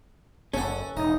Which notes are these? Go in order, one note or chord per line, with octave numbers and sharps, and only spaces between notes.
F#1 C#4 A4 F#5
E1 D#4 D#5